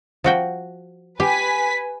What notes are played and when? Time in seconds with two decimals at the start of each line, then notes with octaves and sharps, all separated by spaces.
0.24 F3 F#4 G5
1.20 G4 B4 G#5 B6